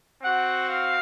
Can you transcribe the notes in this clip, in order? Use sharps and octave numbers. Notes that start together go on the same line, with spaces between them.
C4 F#4 F#5
F5